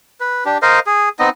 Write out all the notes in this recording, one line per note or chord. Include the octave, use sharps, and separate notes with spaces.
B4
D4 G4
A#4 C5 D#5 F5
G#4
B3 C4 D#4 D#5